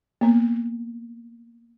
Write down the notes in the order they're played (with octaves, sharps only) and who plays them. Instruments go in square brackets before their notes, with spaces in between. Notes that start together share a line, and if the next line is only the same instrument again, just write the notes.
[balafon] A#3 B3